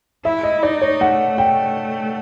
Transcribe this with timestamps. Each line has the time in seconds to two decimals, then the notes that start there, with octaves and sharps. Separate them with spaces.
0.25 E4 E5
0.43 D#5
0.63 D#4 D5
0.82 C#5
1.01 A3 F#5
1.38 G5